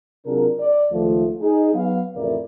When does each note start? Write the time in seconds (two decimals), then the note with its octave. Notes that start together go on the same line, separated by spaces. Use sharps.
0.26 C3 F#3 D4 F4 G#4 A#4
0.60 D5
0.92 C#2 D#3 F3 A3
1.42 D#4 G#4
1.74 F#3 B3 F5
2.16 A1 F2 C#3 E4 A#4 D5